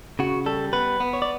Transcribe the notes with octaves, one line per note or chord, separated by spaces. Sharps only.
C#3 F#4
G3 A4
B3 B4
B3
C#5
D5